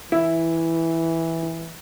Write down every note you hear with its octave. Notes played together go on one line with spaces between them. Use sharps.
E3 E4